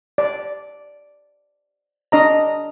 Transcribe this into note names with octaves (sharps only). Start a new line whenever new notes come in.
D5
D4 D#5 A#5